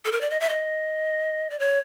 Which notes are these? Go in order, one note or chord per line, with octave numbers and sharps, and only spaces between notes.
A4
A#4
D5
D#5
E5
D#5
D5
C#5